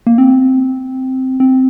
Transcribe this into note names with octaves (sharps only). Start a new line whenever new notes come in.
A#3
C4
C4